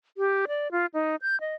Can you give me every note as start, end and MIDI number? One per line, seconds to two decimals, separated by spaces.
0.18 0.46 67
0.48 0.71 74
0.72 0.86 65
0.94 1.16 63
1.22 1.39 91
1.41 1.55 75